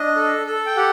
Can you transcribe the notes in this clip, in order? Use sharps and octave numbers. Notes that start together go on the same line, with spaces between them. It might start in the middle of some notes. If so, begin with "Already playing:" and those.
Already playing: D4 D#5
A4
A4
G5
G4 F#5